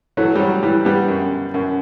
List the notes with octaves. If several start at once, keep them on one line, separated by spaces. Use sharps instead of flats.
E3 F#3 A3
G3
F#3
E3 G3
G3 B3
F#2
F#2